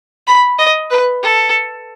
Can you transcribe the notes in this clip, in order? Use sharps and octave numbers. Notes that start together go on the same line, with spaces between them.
B5
D#5
B4
A4